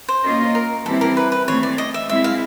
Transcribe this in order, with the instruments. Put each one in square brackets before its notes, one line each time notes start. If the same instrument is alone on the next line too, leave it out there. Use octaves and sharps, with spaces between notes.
[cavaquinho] C5
[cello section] A#3 C#4 F4 A#4 D#5
[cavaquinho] A#4
[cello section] E3 G3 C4 E4 G4 [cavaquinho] A4
[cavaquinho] A#4
B4
B4
[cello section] E3 A3 C4 [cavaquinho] C#5
[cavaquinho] D5
D#5
E5
[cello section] G#3 C4 E4 [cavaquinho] E5
[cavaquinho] F5